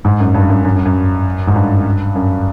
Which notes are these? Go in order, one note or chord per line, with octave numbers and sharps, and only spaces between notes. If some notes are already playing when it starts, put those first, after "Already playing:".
G#2
F#2
G2
F#2
F#2
F#2
F#2
G#2
G2
F#2